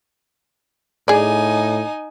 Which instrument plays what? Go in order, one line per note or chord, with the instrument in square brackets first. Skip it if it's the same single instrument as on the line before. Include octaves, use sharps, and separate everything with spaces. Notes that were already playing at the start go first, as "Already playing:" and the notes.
[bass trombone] A2 [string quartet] D#4 G#5 [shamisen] G#4 D5